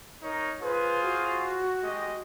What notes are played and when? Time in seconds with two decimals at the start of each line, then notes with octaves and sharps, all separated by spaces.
0.23 D#4 A#4 C#5
0.62 F4 G#4 B4 C5
1.03 F#4
1.82 G#3 G4 D#5